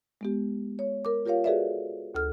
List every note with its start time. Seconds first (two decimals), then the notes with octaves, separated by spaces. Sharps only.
0.21 G#3 B3 G4
0.79 C#5
1.05 A#4 D6
1.26 F4 G4 A#4 C#5 F5
1.44 F#4 G#4 A4 B4 D5 E5
2.15 D2 A4 F6